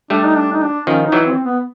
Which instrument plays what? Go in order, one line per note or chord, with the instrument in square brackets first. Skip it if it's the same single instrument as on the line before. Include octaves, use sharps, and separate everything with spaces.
[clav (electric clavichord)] G3 A3 [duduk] D4
[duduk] D#4
D4
D#4
D4
[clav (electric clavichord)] D#3 F3 [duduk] C#4
[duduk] D#4
[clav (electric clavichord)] E3 F#3
[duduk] C4
B3